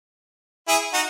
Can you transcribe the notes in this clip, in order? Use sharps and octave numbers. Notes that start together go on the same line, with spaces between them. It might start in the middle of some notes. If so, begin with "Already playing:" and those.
E4 G#4
D#4 F#4